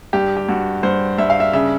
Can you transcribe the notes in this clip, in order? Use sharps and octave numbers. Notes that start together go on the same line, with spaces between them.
G2 G4
G4
G2 F#4
G2 C5
G2 E5
F5
E5
C#3 E5